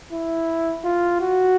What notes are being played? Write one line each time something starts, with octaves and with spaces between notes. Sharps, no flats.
E4
F4
F#4